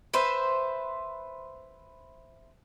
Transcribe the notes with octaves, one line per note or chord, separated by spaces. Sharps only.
B4 C5 E5